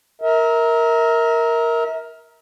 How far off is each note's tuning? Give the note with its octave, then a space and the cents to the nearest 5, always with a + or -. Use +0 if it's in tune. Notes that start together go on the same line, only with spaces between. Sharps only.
A#4 +0 E5 -35